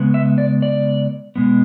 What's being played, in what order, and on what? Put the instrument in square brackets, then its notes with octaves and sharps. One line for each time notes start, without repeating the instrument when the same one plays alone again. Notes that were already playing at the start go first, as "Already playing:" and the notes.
Already playing: [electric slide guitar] C#3 G#3 B3
E5
D5
D5
B2 G#3 B3